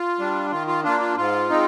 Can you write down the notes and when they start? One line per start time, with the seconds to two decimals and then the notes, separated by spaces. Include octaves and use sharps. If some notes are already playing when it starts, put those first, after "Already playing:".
Already playing: F4
0.19 G3 D4
0.51 D#3 F4
0.67 F4
0.83 A#3 D4 F4
1.00 F4
1.16 G#2 F4
1.49 G#3 C4 D#4